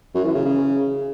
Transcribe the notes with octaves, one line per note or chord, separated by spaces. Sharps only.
F#2
E3
C#3
C#3